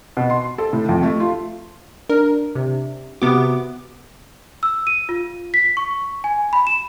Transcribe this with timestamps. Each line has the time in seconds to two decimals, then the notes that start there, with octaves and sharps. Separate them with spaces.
0.17 B2
0.30 C6
0.58 A4
0.73 A2
0.89 F2
1.03 A3
1.20 F4
2.10 D4 A#4
2.55 C3
3.22 C3 B3 F#4 D6
4.63 E6
4.87 D#7
5.09 F4
5.54 B6
5.77 C#6
6.24 G#5
6.53 B5
6.67 E7